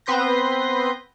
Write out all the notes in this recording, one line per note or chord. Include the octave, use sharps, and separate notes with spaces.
B3 C4 B4 C6 G6 A#6